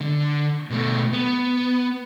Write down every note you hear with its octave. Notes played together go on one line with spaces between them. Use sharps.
D3
B2 A3
B3